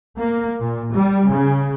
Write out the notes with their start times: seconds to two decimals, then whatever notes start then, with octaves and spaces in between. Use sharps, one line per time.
0.18 A#3
0.59 A#2
0.92 G3
1.29 C#3